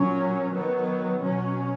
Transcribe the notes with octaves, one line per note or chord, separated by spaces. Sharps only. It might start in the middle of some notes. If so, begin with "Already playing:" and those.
Already playing: A#2 F#3 C#4
D#3 F#3 B3
B2 F#3 C#4